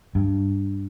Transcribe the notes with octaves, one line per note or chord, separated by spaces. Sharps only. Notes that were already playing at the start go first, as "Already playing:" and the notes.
G2